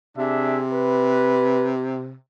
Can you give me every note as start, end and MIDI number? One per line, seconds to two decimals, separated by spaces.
0.18 2.15 48
0.18 0.62 62
0.18 0.62 68
0.18 0.62 76
0.72 1.71 71